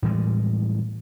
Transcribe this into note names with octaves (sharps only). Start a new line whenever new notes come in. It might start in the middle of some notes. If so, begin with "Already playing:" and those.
A2 E3 G3 G#3